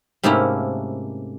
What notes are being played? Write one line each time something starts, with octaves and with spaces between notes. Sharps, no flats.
G#2 C3 A3 A#3 C#4 E4